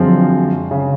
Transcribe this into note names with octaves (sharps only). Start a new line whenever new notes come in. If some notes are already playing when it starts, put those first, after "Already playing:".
Already playing: F#2 D3 F3 G#3 C4
C#3